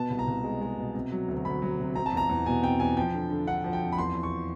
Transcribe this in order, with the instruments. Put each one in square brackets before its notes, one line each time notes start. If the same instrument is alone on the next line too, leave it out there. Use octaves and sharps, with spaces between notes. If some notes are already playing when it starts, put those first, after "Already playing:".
Already playing: [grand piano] B2 B3 A5
C2
A#5
C2
G#3
G#3
B2
C3
F#3
D2
D2 B5
F#3
C3
C4 A#5
A5
E2
A#5
E2
B2 G#5
C4 G5
E2 G#5
F3 G5
D3
D3
D3 F#5
F3
G5
F2
B5
E2 C6
E2
C#6